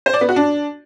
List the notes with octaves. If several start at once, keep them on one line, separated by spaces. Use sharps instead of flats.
C5
D5
B3
F#4
D4